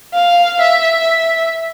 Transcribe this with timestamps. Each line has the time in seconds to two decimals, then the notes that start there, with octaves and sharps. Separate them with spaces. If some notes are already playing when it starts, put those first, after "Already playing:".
0.14 F5
0.61 E5